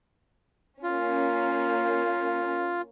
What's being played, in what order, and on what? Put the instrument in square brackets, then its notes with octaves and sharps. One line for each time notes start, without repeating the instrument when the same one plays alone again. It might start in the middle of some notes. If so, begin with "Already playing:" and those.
[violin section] A#3 C#4 [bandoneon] F4